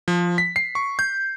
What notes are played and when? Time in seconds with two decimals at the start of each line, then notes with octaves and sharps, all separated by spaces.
0.08 F3
0.38 B6
0.56 C7
0.75 C#6
0.99 G6